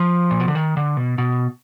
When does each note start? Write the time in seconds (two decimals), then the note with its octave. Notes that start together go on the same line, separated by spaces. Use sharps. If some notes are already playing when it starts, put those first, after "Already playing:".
Already playing: F3
0.31 A#2
0.40 B2
0.48 D3
0.55 D#3
0.77 D3
0.97 B2
1.18 B2